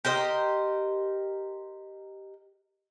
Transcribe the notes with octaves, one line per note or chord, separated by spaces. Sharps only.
G4 A#4 C5 D#5